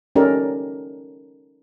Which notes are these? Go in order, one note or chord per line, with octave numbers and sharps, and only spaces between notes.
C#4 D#4 G4 A4 A#4 D5